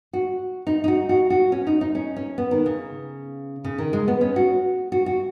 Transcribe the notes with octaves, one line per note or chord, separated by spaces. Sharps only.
F#4
D#4
D#4
F#4
F#4
F#4
C#4
D#4
D#4
C#4
C#4
B3
D#3
C#3
C#3
D#3
G#3
B3
C#4
F#4
F#4
F#4